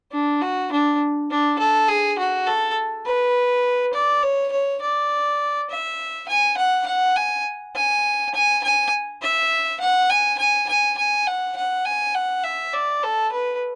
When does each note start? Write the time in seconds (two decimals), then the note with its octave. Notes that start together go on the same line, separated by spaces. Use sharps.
0.12 D4
0.41 F#4
0.71 D4
1.30 D4
1.59 A4
1.88 G#4
2.18 F#4
2.47 A4
3.06 B4
3.94 D5
4.23 C#5
4.52 C#5
4.81 D5
5.70 E5
6.28 G#5
6.57 F#5
6.86 F#5
7.16 G#5
7.76 G#5
8.34 G#5
8.63 G#5
9.22 E5
9.80 F#5
10.10 G#5
10.39 G#5
10.68 G#5
10.98 G#5
11.27 F#5
11.56 F#5
11.85 G#5
12.15 F#5
12.44 E5
12.73 D5
13.03 A4
13.32 B4